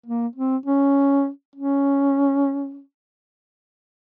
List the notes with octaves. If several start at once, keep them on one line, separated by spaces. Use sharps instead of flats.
A#3
C4
C#4
C#4